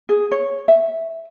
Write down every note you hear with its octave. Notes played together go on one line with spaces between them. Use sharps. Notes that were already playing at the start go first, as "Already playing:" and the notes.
G#4
C#5
E5